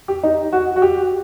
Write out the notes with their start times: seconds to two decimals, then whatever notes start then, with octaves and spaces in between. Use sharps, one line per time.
0.08 G4
0.23 D#4
0.53 F#4
0.76 F#4
0.82 G4